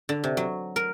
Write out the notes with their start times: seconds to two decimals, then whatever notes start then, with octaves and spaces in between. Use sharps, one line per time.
0.09 D3
0.24 C3
0.37 F#3
0.76 A#4